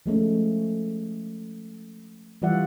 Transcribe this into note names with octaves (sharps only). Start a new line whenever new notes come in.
F3 G#3 A3 C#4
E3 G3 F4 D5 E5 F#5